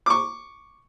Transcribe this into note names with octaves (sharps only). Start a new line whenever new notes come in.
C#6 D6